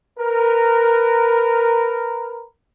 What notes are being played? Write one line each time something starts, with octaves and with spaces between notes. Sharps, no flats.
A#4 B4